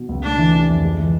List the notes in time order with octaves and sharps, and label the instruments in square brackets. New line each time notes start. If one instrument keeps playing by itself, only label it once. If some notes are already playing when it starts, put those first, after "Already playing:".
Already playing: [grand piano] B2
C#2
[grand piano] A3 [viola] D4
[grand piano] E3
C3
F2
G#3
E3